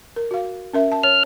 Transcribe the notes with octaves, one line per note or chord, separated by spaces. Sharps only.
A#4
F#4 F5
C#4 A#4 E5
A5
C#5 F6